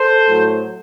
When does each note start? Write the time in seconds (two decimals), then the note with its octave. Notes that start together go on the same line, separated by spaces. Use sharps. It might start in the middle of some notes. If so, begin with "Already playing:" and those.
Already playing: A4 C5
0.26 A2 F#3